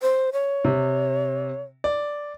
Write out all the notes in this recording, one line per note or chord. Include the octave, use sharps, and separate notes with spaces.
C5
C#5
C3
D5